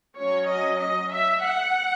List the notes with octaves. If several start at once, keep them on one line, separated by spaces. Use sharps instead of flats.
F#3 C#4 C#5
D#5
D#5
E5
F#5